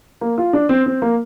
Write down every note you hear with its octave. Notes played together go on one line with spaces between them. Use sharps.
A#3
F4
D4
C4
C4
A#3